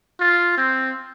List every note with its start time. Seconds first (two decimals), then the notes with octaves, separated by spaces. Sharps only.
0.20 F4
0.58 C4